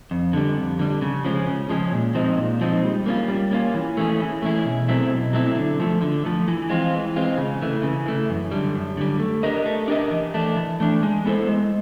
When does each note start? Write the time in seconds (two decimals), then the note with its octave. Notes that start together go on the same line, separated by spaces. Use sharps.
0.11 F2
0.33 D3 G3
0.57 F2
0.79 D3 G3
1.02 C#3
1.25 F3 G#3 C#4
1.47 C#3
1.69 F3 G#3 C#4
1.92 A#2
2.15 F3 G#3 C4 D#4
2.38 A#2
2.61 F3 G#3 C4 D#4
2.84 G3
3.06 A#3 C#4 F4
3.28 G3
3.51 A#3 C#4 F4
3.74 E3
3.97 A3 C#4 E4 G#4
4.20 E3
4.42 A3 C#4 E4 G#4
4.65 B2
4.88 F#3 A3 C4 E4
5.11 B2
5.33 F#3 A3 C4 E4
5.56 D3
5.80 F3 A3
6.01 D3
6.25 F3 A3
6.48 E3
6.69 G#3 C4 F4
6.93 E3
7.16 G#3 C4 F4
7.38 C#3
7.62 E3 A3
7.83 C#3
8.06 E3 A3
8.30 F#2
8.51 D3 G3
8.75 F#2
8.97 D3 G3
9.20 A3
9.43 D4 G4 A#4 D#5
9.66 A3
9.88 D4 G4 A#4 D#5
10.11 E3
10.34 A3 D4
10.56 E3
10.80 A3 D4
11.03 G#3
11.26 B3 E4 A4 C5
11.48 G#3